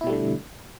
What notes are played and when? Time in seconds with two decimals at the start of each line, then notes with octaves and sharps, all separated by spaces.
0.01 E4
0.04 B2
0.07 G3
0.10 A3
0.13 D3